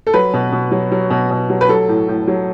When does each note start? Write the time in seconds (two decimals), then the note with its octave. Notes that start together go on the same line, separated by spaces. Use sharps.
0.07 A4
0.13 F#3 B4
0.34 B2
0.52 B2
0.71 F#3
0.91 F#3
1.10 B2
1.31 B2
1.50 F#3
1.61 B4
1.69 F#3 A4
1.88 A2
2.08 A2
2.27 F#3